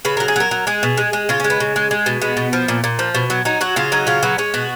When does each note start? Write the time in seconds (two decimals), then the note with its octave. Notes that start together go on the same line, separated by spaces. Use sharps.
0.05 C#3 B4
0.17 F#3 A#4
0.28 G#4
0.36 F#3 A#4
0.51 F#3
0.67 G#3 G#4
0.83 B2
0.97 G#3
1.13 G#3
1.29 C#3 F4
1.40 C#4
1.44 G#3
1.50 B3
1.60 C#3
1.76 G#3
1.91 G#3
2.06 B2
2.22 G#3 B3
2.37 B2
2.53 F3
2.68 A#2
2.84 A#2
2.99 F3
3.15 B2
3.30 F#3
3.45 F#3 D#4
3.61 F#3 F#4
3.76 C#3 F4
3.92 F#3 D#4
4.07 C#3 F4
4.23 F#3 B3
4.38 G#3 C#4
4.54 B2 F#4